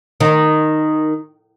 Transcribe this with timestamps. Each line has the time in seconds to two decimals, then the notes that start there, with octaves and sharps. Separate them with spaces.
0.20 D#3